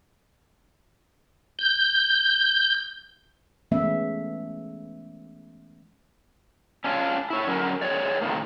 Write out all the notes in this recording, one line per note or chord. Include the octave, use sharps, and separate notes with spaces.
G6
E3 G#3 A3 B3 C#4 E5
C#4 D4 F4
E4 C#5
D3 F#3 C#4 A#4
E3 G#3 F4 G4 C#5 D5
A2 C3 D#3 A#3